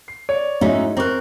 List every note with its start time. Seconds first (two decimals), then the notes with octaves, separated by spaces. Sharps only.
0.08 C7
0.29 C#5 D5
0.61 G#2 A3 C#4 D#4 E4 F#4
0.97 C4 A#4 A#5 C#6 F#6